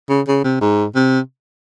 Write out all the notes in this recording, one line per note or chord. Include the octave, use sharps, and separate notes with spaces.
C#3
C#3
C3
G#2
C3